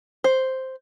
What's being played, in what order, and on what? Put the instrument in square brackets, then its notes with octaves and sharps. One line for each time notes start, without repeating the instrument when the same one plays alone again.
[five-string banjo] C5